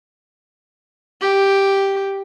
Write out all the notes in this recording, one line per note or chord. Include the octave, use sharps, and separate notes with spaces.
G4